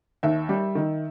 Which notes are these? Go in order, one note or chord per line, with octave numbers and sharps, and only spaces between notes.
D#2 E5
G3
D#3